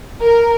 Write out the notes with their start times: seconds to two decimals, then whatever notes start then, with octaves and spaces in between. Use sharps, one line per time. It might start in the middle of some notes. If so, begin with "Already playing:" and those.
0.22 A#4